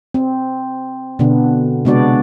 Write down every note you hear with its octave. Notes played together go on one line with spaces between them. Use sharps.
C4
B2 D3 B3 D4
C3 G#3 B3 D4 F#4 D5